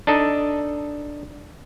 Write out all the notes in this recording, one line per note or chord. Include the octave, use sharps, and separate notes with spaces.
D4 D#4 A4 D#5